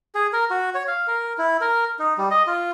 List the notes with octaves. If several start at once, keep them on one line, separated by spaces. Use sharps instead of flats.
G#4
A#4
F#4
C#5
F5
A#4
E4
A#4
D#4
G3
D#5
F4